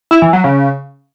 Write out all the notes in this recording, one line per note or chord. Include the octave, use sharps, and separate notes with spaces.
E4
E3
F#3
C#3